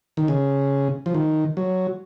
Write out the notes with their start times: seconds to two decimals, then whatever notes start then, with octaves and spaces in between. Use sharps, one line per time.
0.17 D#3
0.28 C#3
1.06 F3
1.15 D#3
1.57 F#3